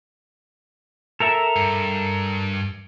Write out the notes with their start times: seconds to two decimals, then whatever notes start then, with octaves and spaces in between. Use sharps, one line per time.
1.20 A4 A#4 E5
1.56 G2